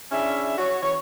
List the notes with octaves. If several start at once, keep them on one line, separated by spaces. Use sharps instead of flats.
C#4 D4 E4 G#4 E5
F#4 C#5
E3 C#4 C#5